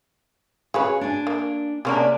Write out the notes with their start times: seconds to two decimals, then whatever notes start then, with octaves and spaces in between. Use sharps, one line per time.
0.74 C#3 F#4 G#4 B4 C#5
1.01 D4 G#5
1.27 A#3
1.85 C3 G#3 A#3 C#4 D4